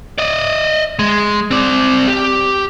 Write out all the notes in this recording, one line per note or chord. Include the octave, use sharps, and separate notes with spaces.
D5 D#5
G#3
C4 D5
G4